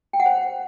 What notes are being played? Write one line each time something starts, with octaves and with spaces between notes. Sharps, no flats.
G5
F#5
C5